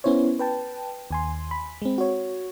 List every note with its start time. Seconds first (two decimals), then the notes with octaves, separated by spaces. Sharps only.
0.04 B3 C#4 E4 C5 C#5
0.39 B4 G5 A5
1.11 D#2 G#5 C6
1.51 B5
1.82 G#3 C4
1.98 F#4 C#5